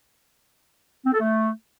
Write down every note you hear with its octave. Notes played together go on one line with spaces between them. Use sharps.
C4
A4
A3